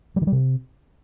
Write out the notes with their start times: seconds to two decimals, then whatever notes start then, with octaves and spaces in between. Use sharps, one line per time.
0.16 G3
0.22 D#3
0.27 G3
0.32 C3